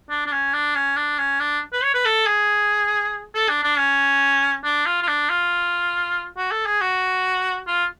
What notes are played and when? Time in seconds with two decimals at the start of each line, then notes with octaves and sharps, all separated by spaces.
0.10 D4
0.26 D4
0.32 C#4
0.53 D4
0.75 C#4
0.97 D4
1.18 C#4
1.40 D4
1.73 B4
1.83 C#5
1.94 B4
2.05 A4
2.27 G#4
3.34 A4
3.49 D4
3.63 D4
3.78 C#4
4.64 D4
4.86 F4
5.02 F4
5.08 D4
5.29 F4
6.37 F#4
6.51 A4
6.66 G#4
6.81 F#4
7.67 F4